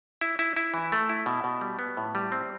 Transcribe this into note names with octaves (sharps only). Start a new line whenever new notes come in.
E4
E4
E4
E3
A3
E4
B2
B2
G3
B3
A2
G3
C4